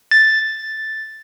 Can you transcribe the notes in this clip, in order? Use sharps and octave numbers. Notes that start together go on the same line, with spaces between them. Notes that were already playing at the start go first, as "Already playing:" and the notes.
A6